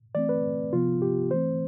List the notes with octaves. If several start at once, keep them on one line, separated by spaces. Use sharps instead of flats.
E3 A3 C4 D5
B4
C3 F3 B3 F4
G4
E3 A3 C4 C5